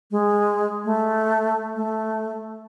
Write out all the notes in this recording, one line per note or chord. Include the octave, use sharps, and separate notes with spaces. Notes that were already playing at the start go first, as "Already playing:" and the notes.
G#3
A3
A3